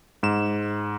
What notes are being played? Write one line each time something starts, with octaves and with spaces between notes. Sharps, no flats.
G#2 E7